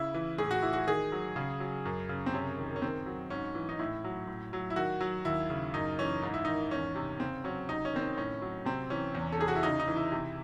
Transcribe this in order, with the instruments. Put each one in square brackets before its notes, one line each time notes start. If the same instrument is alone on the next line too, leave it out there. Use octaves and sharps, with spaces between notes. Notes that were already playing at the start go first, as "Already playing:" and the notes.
Already playing: [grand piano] C#3 E4
E3
A2 G#4
F#4
E3 E4
F#4
D#3 G#4
F#3
C#3
F#3
F#2
C#3
C4
C3 C#4
D#3
C#4
D#3 C4
F#3
G#2 C#4
E3
D#4
A2 E4
F#3
A2
F#3
E4
D#3 F#4
F#3
D#2 E4
C#3
F#2 D#4
E3 C#4
G#2 D#4
E4
D#3 D#4
E2 C#4
C3
C#3 C4
F#3 C#4
C3 D#4
C#4
D#3 C4
C#4
A2 C#4
F#3
C3 C4
E3 C#4
E2
A4
C3 G#4
F#4
E4
C#3 D#4
D#4
E3
E4
C3